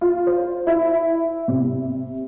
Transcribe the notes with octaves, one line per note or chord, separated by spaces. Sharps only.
F4
C5
E4
C3